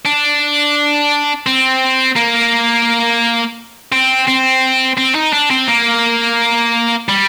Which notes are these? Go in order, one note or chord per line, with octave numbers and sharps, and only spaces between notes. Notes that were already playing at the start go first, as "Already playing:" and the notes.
D4
C4
A#3
C4
C4
C4
D#4
D4
C4
A#3
G3